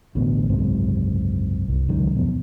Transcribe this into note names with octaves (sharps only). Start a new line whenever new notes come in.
A1 D2 B2
F#1 C2 G#2 C3
C2
C#2 F#2 D#3
F2 B2